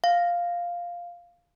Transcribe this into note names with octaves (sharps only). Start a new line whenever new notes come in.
F5